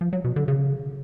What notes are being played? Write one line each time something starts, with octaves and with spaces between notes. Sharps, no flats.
F3
F#3
B2
D3
C#3